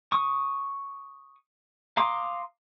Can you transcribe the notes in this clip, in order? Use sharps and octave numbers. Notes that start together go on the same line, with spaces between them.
C#6 D#6
F5 A#5 C6 D6 D#6